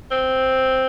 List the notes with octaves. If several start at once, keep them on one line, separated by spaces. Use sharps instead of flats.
C4